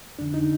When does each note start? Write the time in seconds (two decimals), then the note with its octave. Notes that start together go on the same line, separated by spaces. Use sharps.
0.19 F2 D3 D4
0.34 D#4